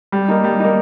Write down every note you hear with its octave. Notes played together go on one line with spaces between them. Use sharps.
G3
A#3 D#4
G3
A#3 D#4